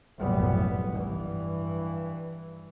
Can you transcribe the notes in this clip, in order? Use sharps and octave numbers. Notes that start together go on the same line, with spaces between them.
F1 B1 F#2 A2 G3 B3
G2 E3